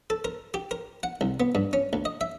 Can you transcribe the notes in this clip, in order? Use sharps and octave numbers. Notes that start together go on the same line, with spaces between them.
A4
A#4
G4
A#4
F#5
C2
B3
G2
C#4
D2
D#5
E5